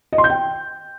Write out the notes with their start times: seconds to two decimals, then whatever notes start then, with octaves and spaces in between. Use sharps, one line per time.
0.13 D#5
0.18 C6
0.24 G6
0.30 G5